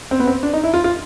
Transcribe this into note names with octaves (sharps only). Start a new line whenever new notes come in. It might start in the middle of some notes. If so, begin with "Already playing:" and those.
C4
B3
C4
D4
D#4
E4
F4
F4